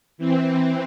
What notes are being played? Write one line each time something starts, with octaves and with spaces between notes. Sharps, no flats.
E3 C4